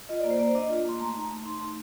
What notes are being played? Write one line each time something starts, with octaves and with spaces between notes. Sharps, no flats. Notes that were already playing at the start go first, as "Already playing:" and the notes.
F4 D#5
A#3 D5
C5
A#3 D5
D4 D#5
F4
A#3 C6
A3 A#5
D#4
A3
D#4 C6
A3